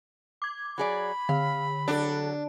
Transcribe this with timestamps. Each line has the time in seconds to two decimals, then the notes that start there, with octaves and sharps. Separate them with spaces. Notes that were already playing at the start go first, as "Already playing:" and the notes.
0.42 D6 G#6
0.78 F#3 G#4 D5 B5
1.29 D3 F5
1.88 F#3 D4 A4